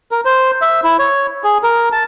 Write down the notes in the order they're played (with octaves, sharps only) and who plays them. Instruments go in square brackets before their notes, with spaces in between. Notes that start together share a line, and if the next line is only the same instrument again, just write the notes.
[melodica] A#4
C5
E5
E4
C#5
G#4
A#4
A5